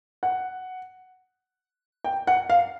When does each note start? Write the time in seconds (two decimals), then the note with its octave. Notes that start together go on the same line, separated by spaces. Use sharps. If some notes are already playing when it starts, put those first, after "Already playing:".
0.23 F#5
2.04 G5
2.27 F#5
2.50 F5